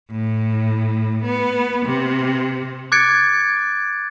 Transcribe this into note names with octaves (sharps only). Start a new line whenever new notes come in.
A2
B3
C3
D6 F#6 G#6 A6 C#7 D7